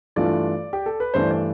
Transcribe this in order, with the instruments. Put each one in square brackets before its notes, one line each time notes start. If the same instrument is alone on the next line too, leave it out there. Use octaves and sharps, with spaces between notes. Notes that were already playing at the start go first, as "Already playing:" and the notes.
[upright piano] G2 E3 A3 D4 F4 [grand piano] D5
[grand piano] G4
A4
B4
[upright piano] G2 E3 A3 D4 [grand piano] C5
[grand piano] D5